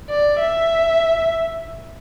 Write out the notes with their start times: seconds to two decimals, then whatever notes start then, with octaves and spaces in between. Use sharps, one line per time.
0.10 D5
0.40 E5